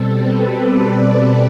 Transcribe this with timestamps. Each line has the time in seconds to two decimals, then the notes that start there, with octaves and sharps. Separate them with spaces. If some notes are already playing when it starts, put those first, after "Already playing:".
Already playing: B2 G3 C4 A4
0.12 B4
0.53 D5